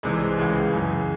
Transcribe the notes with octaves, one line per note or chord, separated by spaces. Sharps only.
C2 C3 E3 G#3
G#3
C#2 C#3 E3 G#3
F#2 C#3 E3